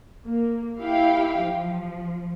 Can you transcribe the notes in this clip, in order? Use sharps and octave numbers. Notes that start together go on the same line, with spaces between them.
A#3
E4 G4 F5 G5
F3